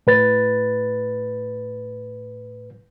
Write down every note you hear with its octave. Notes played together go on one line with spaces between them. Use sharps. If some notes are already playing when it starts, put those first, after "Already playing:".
A2 B4 A6